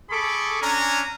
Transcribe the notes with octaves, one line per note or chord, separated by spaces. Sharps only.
G#4 A4 B5 C#6 D6
C#4 D4 G#5 A#5